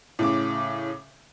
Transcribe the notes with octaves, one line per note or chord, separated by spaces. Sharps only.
A2 C#3 D6